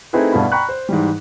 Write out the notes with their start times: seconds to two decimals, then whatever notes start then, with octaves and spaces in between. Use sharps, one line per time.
0.13 A3 C4 D#4 E4 G#4 B4
0.32 G2 B2 E4 F5 B5
0.52 G5 A#5 B5 C#6 F#6
0.69 C5
0.89 G#2 E3 G3